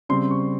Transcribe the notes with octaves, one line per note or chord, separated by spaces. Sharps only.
C#3 G3 C4 C6
C#6